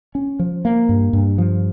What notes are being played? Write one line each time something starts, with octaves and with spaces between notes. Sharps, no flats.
C#4
F3
A#3
G2
G2
F3